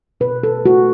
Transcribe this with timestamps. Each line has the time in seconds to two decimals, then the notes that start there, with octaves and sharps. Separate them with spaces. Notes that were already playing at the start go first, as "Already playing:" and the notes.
0.20 B2 B4
0.43 A4
0.65 A3 F#4